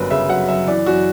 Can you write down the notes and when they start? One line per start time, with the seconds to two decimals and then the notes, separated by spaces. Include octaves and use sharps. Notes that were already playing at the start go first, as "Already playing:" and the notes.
Already playing: G1 F#2 F#3 A#4 B4
0.10 C#3 E5
0.29 F#3 F#5
0.48 F#2 E5
0.67 E3 D5
0.86 F#2 F#4